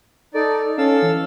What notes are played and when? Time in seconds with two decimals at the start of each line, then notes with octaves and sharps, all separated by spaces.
0.34 D#4 A4 D5
0.78 C#4 A4 F5 E6
1.02 E3